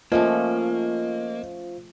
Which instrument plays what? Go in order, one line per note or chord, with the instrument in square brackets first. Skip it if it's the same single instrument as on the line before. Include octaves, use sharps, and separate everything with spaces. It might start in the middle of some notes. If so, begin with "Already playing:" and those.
[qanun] F3 A3 C#4 [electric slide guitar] A#3 [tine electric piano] F4 C5 F5 [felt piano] D#5